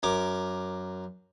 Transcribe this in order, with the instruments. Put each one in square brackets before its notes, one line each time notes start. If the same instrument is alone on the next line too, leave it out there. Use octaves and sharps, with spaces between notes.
[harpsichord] F#2 A#4 D6